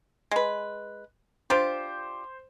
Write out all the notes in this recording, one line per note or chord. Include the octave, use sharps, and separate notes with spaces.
G#3 B4
D4 F4 G4 C5